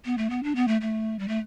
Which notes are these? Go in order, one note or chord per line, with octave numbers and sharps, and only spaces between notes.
B3
A3
B3
D4
B3
A3
A3
G3
A3